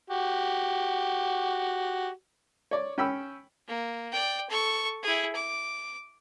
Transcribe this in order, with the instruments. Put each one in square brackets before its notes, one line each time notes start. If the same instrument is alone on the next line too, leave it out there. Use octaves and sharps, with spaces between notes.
[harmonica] F#4 G4
[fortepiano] C#5 D5
C#4 G5 B5 E6
[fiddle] A#3
D5 G5
A4 C#6
E4 G#4
D6